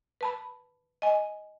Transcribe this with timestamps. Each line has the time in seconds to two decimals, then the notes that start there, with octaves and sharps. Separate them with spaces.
0.21 B4 A5 B5
1.02 D#5 G#5